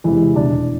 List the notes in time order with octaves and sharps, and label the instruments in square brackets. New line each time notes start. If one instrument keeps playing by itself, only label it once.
[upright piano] E2 C3 E3 G#3 E4
F1 E2 B2 D4